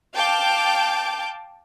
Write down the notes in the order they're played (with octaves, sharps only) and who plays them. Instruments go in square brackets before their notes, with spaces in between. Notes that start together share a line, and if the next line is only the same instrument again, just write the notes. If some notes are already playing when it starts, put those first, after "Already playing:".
[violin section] F5 G5 A5 D6 G6